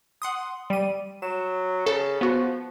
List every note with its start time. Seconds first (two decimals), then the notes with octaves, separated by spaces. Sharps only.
0.22 F#5 C6 D#6
0.70 G3 D#7
1.22 F#3 E7
1.86 C#3 A4
2.21 F3 B3 F#4